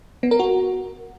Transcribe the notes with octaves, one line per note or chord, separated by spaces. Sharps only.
B3
A#4
F#4